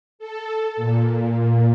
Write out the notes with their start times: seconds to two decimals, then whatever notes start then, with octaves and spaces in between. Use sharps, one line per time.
0.19 A4
0.76 A#2